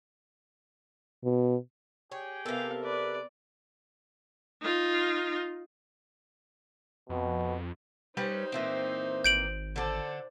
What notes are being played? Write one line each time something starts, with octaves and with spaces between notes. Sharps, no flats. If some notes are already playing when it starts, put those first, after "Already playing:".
B2
G4 G#4 C#5 G5
C3 B3 A4 A#4 F5
B4 D5
D#4 F4
F2 B2
G3 C#4 D#4 B4 C5
A#2 E3 C4
G#1 G6 D7 F#7
D3 A4 C5 D5